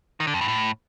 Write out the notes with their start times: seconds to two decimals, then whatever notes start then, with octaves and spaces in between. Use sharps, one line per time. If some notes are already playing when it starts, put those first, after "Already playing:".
0.20 D#3
0.27 D3
0.34 F2
0.41 G2
0.48 A2